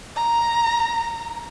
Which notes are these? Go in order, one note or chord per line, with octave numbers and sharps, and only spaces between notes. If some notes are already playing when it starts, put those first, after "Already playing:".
A#5